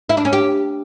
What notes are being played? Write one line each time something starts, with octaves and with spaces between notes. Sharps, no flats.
E4
D4
C#4
G4